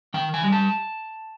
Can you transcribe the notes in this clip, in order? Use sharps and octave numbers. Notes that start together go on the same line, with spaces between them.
D#3 G5
G#5
G3
A5